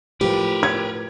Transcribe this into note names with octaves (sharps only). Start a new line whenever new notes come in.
A2 F3 G4 A#4 B4
G#6